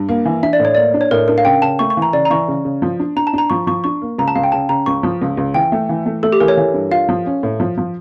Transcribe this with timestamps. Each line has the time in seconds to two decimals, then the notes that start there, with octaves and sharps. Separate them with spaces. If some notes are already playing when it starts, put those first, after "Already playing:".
Already playing: G2
0.09 A#3
0.25 E3
0.43 D4 E5
0.53 D5
0.60 A2
0.65 C#5
0.75 A#3 D5
0.94 D4
1.01 C#5
1.11 A2 A#4
1.28 D4 A#4
1.38 F5
1.45 C#3 G5
1.62 C#3 A5
1.79 A3 C#6
1.90 C#6
1.97 E3
2.02 A#5
2.13 C#3 D5
2.25 A#5
2.30 E3 C#6
2.48 C#3
2.65 C#3
2.82 F3
3.00 D4
3.16 D4 A#5
3.27 A5
3.33 D4 A#5
3.50 F3 C#6
3.67 F3 C#6
3.84 D4 C#6
4.02 A#3
4.18 C#2 A#5
4.28 A5
4.36 C#2 F5
4.44 G5
4.52 C#3 A5
4.69 C#3 A#5
4.86 C#2 C#6
5.03 F3
5.22 C#2
5.37 C#2
5.54 E3 G5
5.72 A3
5.89 E3
6.06 A3
6.23 A3 A4
6.32 G4
6.40 E3 A#4
6.48 C#5
6.57 E3
6.74 G2
6.91 F4 F5
7.09 F3
7.26 C#4
7.43 A2
7.60 F3
7.78 F3